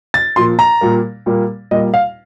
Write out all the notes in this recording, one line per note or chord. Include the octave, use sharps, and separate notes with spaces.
A6
A#2 F3 A#3 C6
A#5
A#2 G3 A#3
A#2 G3 A#3
A#2 G3 A#3 D#5
F5